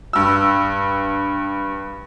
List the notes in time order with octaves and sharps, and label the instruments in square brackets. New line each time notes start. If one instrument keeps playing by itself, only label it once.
[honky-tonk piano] G2 E6